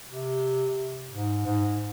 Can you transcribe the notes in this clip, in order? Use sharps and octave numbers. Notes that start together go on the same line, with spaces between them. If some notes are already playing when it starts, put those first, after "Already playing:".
C3
G#2
G#2